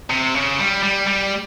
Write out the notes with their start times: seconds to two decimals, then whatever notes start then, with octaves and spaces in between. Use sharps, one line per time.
0.10 C3
0.35 C#3
0.59 G3
0.83 G3
1.07 G3